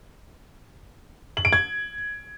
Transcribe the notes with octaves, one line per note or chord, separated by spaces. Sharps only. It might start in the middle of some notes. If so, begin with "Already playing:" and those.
F#7
D7
G#6